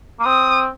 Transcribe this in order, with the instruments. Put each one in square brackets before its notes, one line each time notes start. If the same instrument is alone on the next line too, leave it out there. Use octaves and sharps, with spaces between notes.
[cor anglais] A#3
[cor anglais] C4 [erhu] D#6